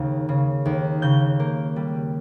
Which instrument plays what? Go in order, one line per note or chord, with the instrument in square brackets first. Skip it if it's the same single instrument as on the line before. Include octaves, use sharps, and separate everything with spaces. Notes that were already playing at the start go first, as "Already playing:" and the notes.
Already playing: [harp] D#2 C#3
C#3
D#2
C#3 G6
A#3
G3